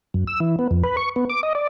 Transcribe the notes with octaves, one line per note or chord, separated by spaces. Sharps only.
F#2
E6
E3
B3
F2
B4
C#6
B3
D6
D#5
D5